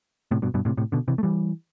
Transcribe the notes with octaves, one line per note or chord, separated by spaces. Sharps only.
A2 C3
G2 B2
G2 B2
A2 C3
A2 C3
B2 D3
C3 E3
A3
E3 G3